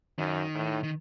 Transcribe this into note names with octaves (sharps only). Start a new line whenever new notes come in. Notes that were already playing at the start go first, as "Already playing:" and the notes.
F#2 D#3
A2
D#3